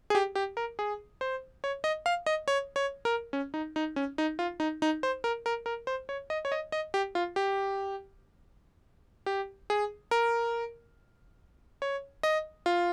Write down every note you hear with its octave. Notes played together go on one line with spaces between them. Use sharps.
G#4
G4
G4
A#4
G#4
C5
C#5
D#5
F5
D#5
C#5
C#5
A#4
C#4
D#4
D#4
C#4
D#4
F4
D#4
D#4
C5
A#4
A#4
A#4
C5
C#5
D#5
C#5
D#5
D#5
G4
F4
G4
G4
G#4
A#4
C#5
D#5
F4